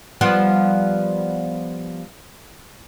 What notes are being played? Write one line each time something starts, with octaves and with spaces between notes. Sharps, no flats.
F3 G3 B3